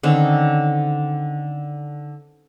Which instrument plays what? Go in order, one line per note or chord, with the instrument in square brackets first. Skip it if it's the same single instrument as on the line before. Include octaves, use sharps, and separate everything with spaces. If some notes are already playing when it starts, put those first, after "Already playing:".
[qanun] D3 D#3 C4 C#4